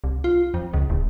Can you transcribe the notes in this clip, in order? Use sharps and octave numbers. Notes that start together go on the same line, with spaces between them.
C2
F4
F2
C#2
D1